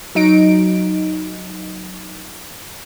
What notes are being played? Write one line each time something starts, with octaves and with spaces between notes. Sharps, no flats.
F#3 D#4 D7